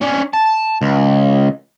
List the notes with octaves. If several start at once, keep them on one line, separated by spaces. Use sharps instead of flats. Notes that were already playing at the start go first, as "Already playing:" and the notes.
C#4 D4
A5
C#2